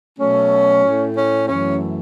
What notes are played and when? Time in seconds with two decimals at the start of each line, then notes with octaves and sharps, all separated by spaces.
0.19 B2 F#3 A3 C#4
0.84 A2 A3
1.16 C#4
1.48 F#2 E3 A3 C#4